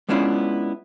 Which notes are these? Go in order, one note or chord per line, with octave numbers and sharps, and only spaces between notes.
G#3 B3 C#4 D4 E4 F4